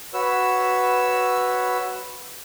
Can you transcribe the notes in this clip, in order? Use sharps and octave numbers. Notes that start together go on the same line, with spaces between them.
F#4 B4 C#5 E6